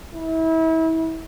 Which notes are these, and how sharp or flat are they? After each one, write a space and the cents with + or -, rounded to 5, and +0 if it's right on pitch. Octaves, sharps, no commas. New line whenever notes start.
E4 -30